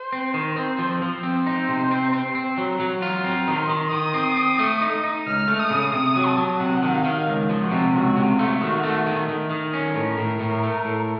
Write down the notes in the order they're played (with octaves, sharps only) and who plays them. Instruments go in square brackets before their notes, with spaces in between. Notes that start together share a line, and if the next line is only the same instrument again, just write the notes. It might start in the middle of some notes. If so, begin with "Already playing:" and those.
Already playing: [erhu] C5
[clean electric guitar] C4
D#3
[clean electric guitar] C4 [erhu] C5
[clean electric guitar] F3
F3
[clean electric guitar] C4 [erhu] C5
[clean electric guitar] D#4
C3
C4
C4
C4
[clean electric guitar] F#3 [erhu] A#5
[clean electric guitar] F#3
F4
[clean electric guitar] C4 [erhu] A#5
[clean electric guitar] D#3
[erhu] C6
[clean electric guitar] D#3
[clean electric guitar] D#3 [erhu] D#6
[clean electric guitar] C4
C4
A3
D#4
D#4
[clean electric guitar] C#2 [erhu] F6
[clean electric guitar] A3
[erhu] D#6
[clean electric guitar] C#3
[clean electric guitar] C3 [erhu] D#6
[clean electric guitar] F#3
[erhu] A5
[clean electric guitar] F#3
[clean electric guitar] C3 [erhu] F#5
[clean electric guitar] D#3
[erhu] F5
[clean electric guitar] D#3
C#2
F3
[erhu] F#4
[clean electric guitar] C3
[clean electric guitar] C#2 [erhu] F#4
[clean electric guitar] C3
[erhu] F4
[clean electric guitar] A3
[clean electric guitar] D#3 [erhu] F#4
[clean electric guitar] A3
D#3
D#3
D#3
C#4
[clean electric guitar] A2 [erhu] A#4
[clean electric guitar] A2
A2
A3
A2